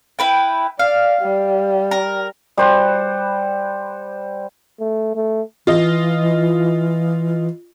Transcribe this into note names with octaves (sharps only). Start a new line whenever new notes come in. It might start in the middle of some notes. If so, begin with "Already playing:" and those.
E4 B4 G5
D5 F5
G3
A#4
G3 C5 F#5
A3
A3
E3 F4 D#5